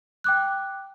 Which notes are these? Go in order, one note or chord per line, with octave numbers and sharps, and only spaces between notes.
G5 D6 F#6